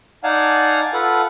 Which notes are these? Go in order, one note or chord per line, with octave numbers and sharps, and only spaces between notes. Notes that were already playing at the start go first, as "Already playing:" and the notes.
D#4 D5 F5 F#5 G#5 A5
F4 A4 B4 F#5